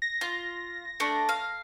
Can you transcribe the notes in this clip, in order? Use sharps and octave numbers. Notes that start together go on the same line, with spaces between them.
A#6
F4
A3 D4
F5